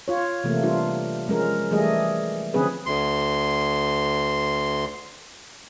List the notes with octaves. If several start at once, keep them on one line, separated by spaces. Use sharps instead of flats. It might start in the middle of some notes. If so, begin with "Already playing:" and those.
F4 C#5
C3 E3 A3 A#3
G3 D4 F4
F3 G#3 C#4 A#4
E3 G3 A3 G#4 D#5
D3 F3 C4 C#4 G#4 B4
D2 C6